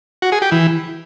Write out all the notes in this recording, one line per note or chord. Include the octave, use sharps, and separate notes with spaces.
F#4
G#4
G4
E3